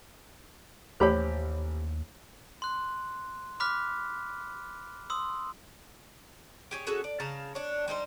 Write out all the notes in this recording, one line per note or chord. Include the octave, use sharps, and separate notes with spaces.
A1 D#2 G4 C5 C#5 B5
C6 F#6
B5 D6 F6 F#6 B6
C6 D#6 E6
G4 G#4 C#5
C#4 F#4 G#4 A4
D5
C#3 F5 A5 A#5
D4 C#5
G3 D#4 E4 C5